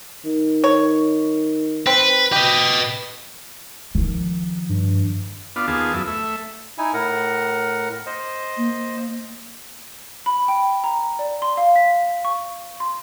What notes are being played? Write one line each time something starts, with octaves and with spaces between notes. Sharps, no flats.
D#3
C#5
C4 B4
G4 B4 D#5
D#3 F3
G2
B3 D4 F4
D#2 B3 F4 G#4 A5
F#2 E4
A3 E5
D#4 E4 G#5
A2 A#4 F#5
C5 D#5
A#3
B5
G5
A#5
D5
C6
F5
B6
C#6
C6